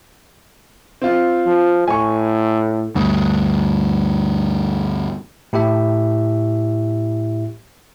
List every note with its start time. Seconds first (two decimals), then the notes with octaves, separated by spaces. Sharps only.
1.02 C4 F4
1.47 F3
1.88 A2 G#5 C#6
2.95 D2 G2
5.53 A2 E4 G4 E5